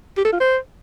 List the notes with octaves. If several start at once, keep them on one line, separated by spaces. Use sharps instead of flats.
G4
A4
F4
C5